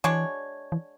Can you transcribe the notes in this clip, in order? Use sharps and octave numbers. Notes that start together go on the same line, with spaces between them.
E3 G#3 D4 F#4 C#5
E3